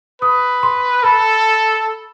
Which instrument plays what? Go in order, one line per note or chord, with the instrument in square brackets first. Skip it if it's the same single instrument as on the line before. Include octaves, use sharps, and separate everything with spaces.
[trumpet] B4 [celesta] D#6
[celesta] C6
[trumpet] A4 [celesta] B5